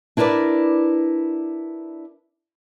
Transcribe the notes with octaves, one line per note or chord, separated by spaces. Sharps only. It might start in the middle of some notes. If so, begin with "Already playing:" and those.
D4 E4 A#4 B4 D5